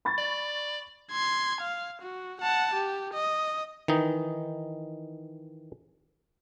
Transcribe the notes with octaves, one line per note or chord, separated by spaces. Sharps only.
B5 C#6 A6
D5
C6 G#6
F5
F#4
F#5 A5
G4
D#5
D#3 E3 D#4